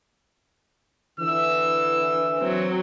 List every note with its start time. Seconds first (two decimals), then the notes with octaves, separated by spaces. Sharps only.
1.20 D3 E3 E6
2.38 F#3 C4